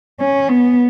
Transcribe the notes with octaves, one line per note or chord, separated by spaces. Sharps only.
C#4
B3